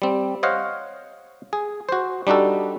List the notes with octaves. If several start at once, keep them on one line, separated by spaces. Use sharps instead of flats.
G3 C4
C5 C#5 D#5 F5 F#5
G#4
F#4 C5
G3 D4 D#4 F#4 A4